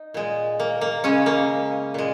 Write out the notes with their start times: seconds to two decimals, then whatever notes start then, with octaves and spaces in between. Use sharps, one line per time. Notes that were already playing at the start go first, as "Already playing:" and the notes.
Already playing: D#4
0.14 A#2 G#3
0.60 A#3
0.81 A#3
1.04 C#3 G#3 C#4
1.26 A#3
1.94 A#2 G#3